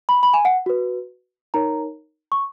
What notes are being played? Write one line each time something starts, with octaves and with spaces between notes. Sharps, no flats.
B5
B5
G#5
F#5
F#4 B4
D#4 A#4 C#5 A#5
C#6